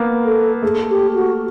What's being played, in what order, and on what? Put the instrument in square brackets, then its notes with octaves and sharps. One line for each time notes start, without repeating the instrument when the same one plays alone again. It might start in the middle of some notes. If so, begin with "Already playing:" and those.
Already playing: [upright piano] A#3 B3
[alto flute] A4
[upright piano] A3 [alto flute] G#4
[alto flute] G4
F#4